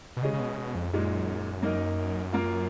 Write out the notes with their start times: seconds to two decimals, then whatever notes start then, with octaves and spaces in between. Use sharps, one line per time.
0.17 B2
0.22 C#3 G#3 C#4 G#4 D#5
0.33 C#3
0.40 B2
0.53 C#3
0.57 B2
0.75 F2
0.93 F#2 A#2 G#3 D#4
1.63 A#3 D#4 A#4 D#5
2.33 A#3 F4 A#4